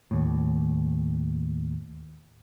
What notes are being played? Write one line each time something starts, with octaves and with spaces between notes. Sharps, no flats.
D#2 A2